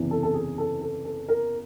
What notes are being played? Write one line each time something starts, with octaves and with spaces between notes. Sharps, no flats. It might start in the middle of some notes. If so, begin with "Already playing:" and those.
Already playing: F#1 E2 C3 E3
A4
A4
G#4
A4
A4
A4
A#4